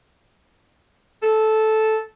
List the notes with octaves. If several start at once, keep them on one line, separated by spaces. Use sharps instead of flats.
A4